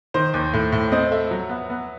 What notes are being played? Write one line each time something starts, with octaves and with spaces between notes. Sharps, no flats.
D#3 C5
D#2
A2
A2
C4 D#5
A3 E5
F#3
B3
B3